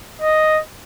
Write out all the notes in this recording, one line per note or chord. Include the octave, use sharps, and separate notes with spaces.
D#5